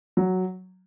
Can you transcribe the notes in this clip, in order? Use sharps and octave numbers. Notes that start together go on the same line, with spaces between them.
F#3